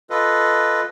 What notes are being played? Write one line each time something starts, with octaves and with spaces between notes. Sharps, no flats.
F4 A4 B4 D#5